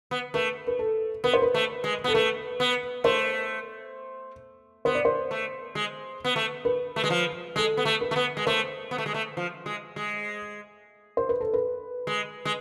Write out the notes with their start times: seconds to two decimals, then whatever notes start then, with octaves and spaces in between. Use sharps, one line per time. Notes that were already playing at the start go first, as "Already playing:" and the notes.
0.11 B3
0.34 A3 B4
0.67 B4
0.79 A4
1.24 B3 B4
1.34 C5
1.42 B4
1.54 A3
1.84 G#3
2.04 B3 A4
2.14 A3 B4
2.60 B3
3.04 A3 C5
4.85 B3 C5
4.95 D5
5.05 C5
5.31 A3
5.75 G#3
6.25 B3
6.36 A3
6.65 B4
6.96 A3
7.04 G#3
7.10 F3
7.56 G#3 A4
7.77 B3
7.85 A3
8.01 B4
8.11 A3
8.16 B3
8.37 G#3
8.47 A3 C5
8.91 B3
8.98 A3
9.06 G#3
9.14 A3
9.37 F3
9.66 G#3
9.96 G#3
11.17 C5
11.29 B4
11.41 A4
11.53 B4
12.07 G#3
12.45 G#3